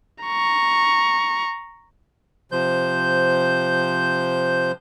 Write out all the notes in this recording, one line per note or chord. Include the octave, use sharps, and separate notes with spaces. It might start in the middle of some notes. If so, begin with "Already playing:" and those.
A#5 C#6
C3 F3 C5 G6